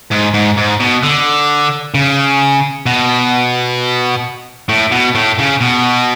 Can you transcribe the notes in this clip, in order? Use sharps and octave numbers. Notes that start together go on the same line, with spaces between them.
G#2
G#2
G#2
B2
D3
C#3
B2
A2
B2
A2
C#3
B2